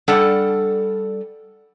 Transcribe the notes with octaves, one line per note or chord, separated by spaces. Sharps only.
G3 D4 A4 F#5 A5